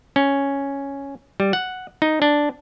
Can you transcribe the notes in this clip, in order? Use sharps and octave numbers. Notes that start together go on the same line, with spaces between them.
C#4
G3
F#5
D#4
D4